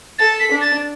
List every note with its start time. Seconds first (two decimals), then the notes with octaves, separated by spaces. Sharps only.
0.19 A4 A6
0.40 B6
0.51 D4
0.61 A6